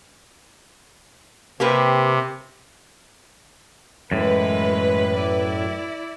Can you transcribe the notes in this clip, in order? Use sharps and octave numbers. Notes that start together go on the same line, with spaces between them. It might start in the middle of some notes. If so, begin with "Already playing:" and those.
C3 A#3 G4 B4
F#2 A2 E3 G#3 B4
E4 D5